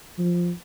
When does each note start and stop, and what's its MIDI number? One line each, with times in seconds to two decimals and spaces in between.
0.19 0.51 53